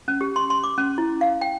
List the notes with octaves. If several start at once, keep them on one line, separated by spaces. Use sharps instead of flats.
C#4
G4
C6
C6
D6
C#4
E4
F5
G5